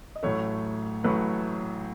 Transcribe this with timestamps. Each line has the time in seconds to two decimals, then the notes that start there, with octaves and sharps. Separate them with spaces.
0.16 D#5
0.23 A1 A2 F#3 A3 C#5
1.04 A1 A2 F#3 A3 B4